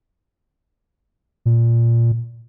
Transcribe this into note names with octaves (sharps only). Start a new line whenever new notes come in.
A#2